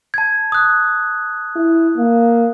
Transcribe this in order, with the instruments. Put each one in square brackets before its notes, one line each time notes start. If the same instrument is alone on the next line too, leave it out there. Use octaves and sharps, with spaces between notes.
[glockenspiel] A5 G#6
D#6 F#6
[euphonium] E4
A#3